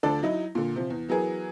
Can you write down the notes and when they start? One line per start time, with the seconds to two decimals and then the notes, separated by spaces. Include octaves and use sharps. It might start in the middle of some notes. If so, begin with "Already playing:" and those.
0.03 D2 F3 D4 A4 D5
0.23 F#3 D#4 E4
0.55 A#2 D3
0.76 C3 F3
0.90 E2
1.09 E3 F#3 B3 G#4 A#4